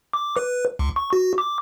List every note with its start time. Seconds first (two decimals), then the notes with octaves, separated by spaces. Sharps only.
0.13 D6
0.36 B4
0.79 C#2
0.96 C#6
1.13 F#4
1.38 D6